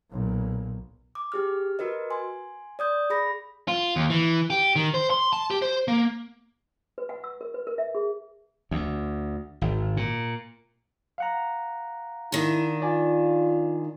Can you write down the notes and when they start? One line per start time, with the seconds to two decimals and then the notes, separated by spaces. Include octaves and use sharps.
0.11 B1 A#2
1.15 D6
1.32 G4 G#4 F6
1.79 F#4 A#4 B4 D#5
2.10 G#5 C6
2.79 D5 D#6 G6
3.10 G#4 B5 A#6
3.68 F4
3.96 D#2
4.10 E3
4.50 G4
4.76 D#3
4.94 C5
5.10 C6
5.33 A5
5.51 G4
5.62 C5
5.88 A#3
6.98 B4
7.09 F#5
7.24 E6
7.41 A#4
7.54 B4
7.67 A#4
7.78 E5
7.95 G#4
8.71 D2
9.61 G#1
9.97 A#2
11.18 F5 F#5 A#5
12.32 D#3 D4 E4
12.82 F4 D5 G#5